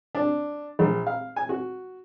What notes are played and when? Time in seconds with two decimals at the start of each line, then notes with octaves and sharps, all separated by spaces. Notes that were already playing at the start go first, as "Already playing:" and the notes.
0.15 D4
0.79 A#1
1.07 F5
1.36 G#5
1.49 F#4